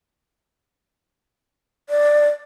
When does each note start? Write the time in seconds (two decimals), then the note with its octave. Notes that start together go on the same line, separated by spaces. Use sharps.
1.90 D5